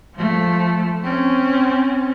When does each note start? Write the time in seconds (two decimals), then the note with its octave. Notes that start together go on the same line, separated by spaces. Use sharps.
0.15 F3 A3
1.04 C4 C#4